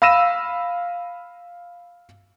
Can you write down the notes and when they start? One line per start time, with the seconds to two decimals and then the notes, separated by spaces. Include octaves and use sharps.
0.02 F5 B5 E6 A#6 D#7 E7